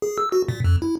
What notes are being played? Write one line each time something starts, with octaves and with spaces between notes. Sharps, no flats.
G#4
E6
F#4
A#2
F2
E4